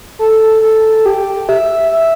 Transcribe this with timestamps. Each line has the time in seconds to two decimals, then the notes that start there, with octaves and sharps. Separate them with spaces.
0.19 A4
0.62 A4
1.06 G4
1.49 E5
1.92 E5